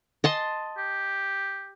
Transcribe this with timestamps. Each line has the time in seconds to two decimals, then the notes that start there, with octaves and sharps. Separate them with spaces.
0.24 D#5 A5 C6
0.77 G4